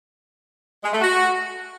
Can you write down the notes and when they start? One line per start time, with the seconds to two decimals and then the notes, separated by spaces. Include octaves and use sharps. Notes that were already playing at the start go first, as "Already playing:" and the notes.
0.84 G#3
0.93 A3
1.01 F#4